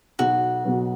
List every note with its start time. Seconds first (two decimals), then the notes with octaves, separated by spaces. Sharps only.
0.19 B1 F#4
0.64 B2 F#3 B3